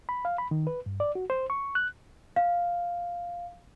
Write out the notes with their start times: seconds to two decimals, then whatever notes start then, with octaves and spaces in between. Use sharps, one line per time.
0.09 B5
0.25 F5
0.38 B5
0.51 D#3
0.67 B4
0.86 G2
1.00 D5
1.15 F#4
1.30 C5
1.50 C#6
1.75 F#6
2.36 F5